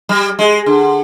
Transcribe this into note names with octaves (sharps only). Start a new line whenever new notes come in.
G3
G#3
D3